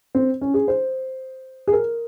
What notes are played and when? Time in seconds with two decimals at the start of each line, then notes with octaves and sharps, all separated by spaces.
0.15 C4
0.41 C#4
0.54 G#4
0.68 C5
1.68 G#4
1.73 A#4